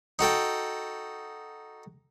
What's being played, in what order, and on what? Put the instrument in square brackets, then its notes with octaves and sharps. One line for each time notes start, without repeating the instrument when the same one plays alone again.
[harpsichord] D#4 F#4 A4 G5